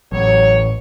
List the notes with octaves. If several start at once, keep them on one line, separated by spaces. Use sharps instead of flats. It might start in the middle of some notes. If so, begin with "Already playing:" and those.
A1 F#3 C#5